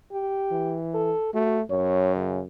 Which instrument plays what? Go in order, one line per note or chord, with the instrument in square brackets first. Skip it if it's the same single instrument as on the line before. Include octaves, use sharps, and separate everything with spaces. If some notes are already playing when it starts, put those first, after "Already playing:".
[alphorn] G4
[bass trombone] E3
[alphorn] A4
[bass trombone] A3 [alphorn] F#4
[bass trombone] F#2 [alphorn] C#5
[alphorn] C#3